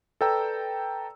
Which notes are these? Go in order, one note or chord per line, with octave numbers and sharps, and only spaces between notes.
A4 B4 D5 G5 A#5 E6